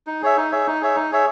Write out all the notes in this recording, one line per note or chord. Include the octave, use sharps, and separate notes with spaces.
D#4
G#4 C#5 E5
D#4
G#4 C#5 E5
D#4
G#4 C#5 E5
D#4
G#4 C#5 E5